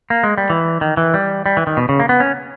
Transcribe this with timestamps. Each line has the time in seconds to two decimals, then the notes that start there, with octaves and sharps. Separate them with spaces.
0.10 A#3
0.23 G#3
0.38 G3
0.50 E3
0.81 D#3
0.97 E3
1.14 G3
1.46 G3
1.57 E3
1.67 D#3
1.77 B2
1.89 C#3
2.00 A#3
2.09 B3
2.20 C#4